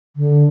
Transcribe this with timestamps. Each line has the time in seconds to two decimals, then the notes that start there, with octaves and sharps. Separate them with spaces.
0.16 D3